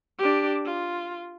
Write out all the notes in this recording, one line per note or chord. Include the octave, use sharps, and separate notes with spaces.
D4 G4
F4